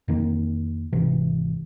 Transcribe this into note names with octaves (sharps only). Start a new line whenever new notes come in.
F2 D#3 A#3
G#1 C3 E3